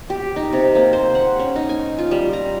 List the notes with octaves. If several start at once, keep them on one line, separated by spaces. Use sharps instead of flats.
G4
D#4
C3
A#3
C5
F#5
C#4
D#4
G#5
F4
G3
A#5